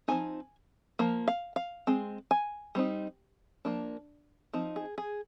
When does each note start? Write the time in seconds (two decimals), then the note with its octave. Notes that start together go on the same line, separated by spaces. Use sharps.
0.08 F3 C4 D#4 G#5
0.99 F3 A#3
1.28 F5
1.56 F5
1.87 G#3 C4
2.31 G#5
2.75 G3 C4 D#4
3.65 F3 A#3 D4
4.53 F3 C4 D#4
4.76 G#4
4.98 G#4